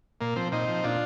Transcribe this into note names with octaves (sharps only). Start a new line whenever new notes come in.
A#2 A#3
F3 C4
A#2 C4 D#4
F3
A#2 D4 F4